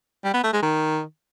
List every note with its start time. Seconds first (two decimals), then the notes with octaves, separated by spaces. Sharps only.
0.24 G3
0.34 B3
0.43 A3
0.53 G#3
0.62 D#3